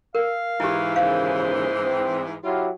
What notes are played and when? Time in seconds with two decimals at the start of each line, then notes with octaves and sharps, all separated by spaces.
0.15 A#4 F5
0.60 G#2 E3 E4 G4
0.96 D#2 A#2 C#3 C5 F5
1.83 C4
2.43 F#3 E4 F4 G4